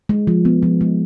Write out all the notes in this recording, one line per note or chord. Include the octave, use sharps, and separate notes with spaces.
G#3
F3
B3
F3
G#3